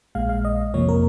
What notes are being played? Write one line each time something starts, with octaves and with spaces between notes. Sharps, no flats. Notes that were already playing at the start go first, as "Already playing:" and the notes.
A#1 A#2 G#3 F5
F5
D#5
F2 C3 F3 A#3 C#5
A#4